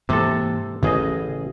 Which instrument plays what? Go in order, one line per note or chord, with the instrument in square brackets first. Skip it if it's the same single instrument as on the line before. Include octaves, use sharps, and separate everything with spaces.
[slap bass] G#2 E3 A#3 [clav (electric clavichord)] C3 A4
[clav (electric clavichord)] A1 G#4 D#5 [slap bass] C#3 E3